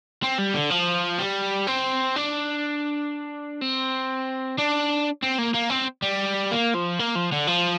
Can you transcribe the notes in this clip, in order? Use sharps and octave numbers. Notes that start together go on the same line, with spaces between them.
C4
G3
D3
F3
G3
C4
D4
C4
D4
C4
A#3
A#3
C4
G3
A#3
F3
A#3
F3
D3
F3